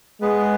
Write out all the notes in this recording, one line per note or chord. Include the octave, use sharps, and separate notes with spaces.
G#3 B3 G#4 B4